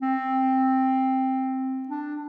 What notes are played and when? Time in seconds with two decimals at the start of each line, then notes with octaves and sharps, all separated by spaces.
0.02 C4
1.88 D4